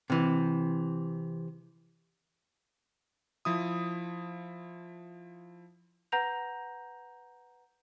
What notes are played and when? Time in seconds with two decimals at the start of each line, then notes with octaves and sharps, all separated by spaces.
0.10 C3 E3
3.45 F3 E4 D#6
6.12 B4 F#5 A#5 G6 A#6 F7